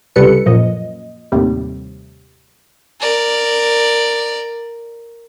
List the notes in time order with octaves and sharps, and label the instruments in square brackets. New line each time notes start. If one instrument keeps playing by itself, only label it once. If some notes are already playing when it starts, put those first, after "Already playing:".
[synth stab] C#2 C3 G3 A4 B4 C#7
F#2 A#2 F3 D#5
D#2 A2 C3 G3
[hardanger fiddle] A#4 D5